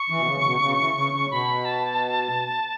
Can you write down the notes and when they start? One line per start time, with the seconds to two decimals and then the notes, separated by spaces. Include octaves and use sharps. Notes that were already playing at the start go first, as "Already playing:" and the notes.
Already playing: C#6
0.10 E3
0.19 B2
0.27 C#3
0.40 C#3
0.44 B2
0.61 C#3
0.79 E3
0.96 C#3
1.14 C#3
1.31 B2 B5
1.65 A5